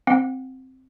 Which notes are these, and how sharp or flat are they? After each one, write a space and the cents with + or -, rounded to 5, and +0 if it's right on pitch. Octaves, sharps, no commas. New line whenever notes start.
C4 +0 F#5 -30